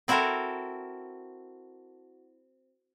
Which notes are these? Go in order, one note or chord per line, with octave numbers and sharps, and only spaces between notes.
C4 E4 F#4 A4 A#4